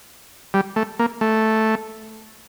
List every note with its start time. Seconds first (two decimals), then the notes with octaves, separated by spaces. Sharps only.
0.54 G3
0.76 A3
0.99 A#3
1.21 A3